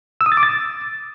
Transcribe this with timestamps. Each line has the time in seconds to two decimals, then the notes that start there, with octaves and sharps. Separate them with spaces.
0.21 E6
0.26 D#6
0.32 A6
0.37 D6
0.43 A6